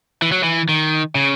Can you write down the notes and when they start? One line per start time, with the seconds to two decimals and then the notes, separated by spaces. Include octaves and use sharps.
0.22 E3
0.32 F#3
0.43 E3
0.69 D#3
1.15 C#3